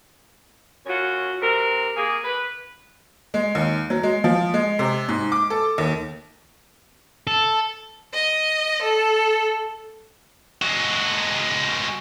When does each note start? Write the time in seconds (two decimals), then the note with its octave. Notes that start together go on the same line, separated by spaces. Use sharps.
0.86 F#2 F#3 C#4 F4 F#4
1.41 C3 A#4
1.96 A#3 G#4
2.25 B4
3.34 G#3
3.55 D#2
3.90 F#3
4.03 G#3
4.24 F3
4.54 G#3
4.79 C3
5.08 G#2
5.32 D6
5.50 A4
5.78 D#2
7.27 A4
8.13 D#5
8.82 A4
10.62 G#3 F#4